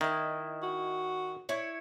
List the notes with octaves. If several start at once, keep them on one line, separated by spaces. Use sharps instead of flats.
D#3 E4 D#5
F#4
E4 C#5